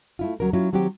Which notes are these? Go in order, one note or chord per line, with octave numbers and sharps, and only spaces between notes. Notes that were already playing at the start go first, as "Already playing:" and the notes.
A3 E4 F4
D2 F#3 C#4 A#4
F#3 C#4 E4 F4
D#3 F#3 C4 F#4 G4